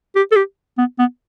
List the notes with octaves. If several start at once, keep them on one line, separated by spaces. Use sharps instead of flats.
G4
A4
G4
B3
B3